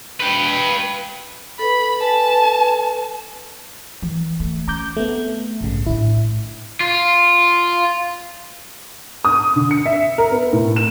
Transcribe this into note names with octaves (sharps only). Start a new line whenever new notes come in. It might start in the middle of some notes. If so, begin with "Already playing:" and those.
B4 G5
A4 B4 B5
A4 B4 G#5 A5
E3
A3
C#4 A#5 D6 G6
A3 B3 C4
A#1 G#2 C#3
A2 D4 E4
F4
D#6
D3
C#7
E5
A#4
B3
A2
E7